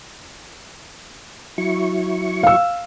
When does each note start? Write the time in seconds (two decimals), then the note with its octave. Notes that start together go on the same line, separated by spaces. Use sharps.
1.58 F#3 E4 C#6
2.43 F5 E6